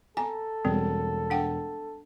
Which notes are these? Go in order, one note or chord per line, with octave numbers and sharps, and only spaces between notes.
A4 G#5 A#5
E1 G3 C4
D4 F#5 G5